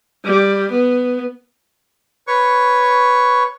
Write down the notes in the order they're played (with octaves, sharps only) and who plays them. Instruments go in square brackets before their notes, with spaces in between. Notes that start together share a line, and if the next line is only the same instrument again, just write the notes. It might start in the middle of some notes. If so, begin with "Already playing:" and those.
[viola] G3
B3
[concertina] B4 C#5 C#6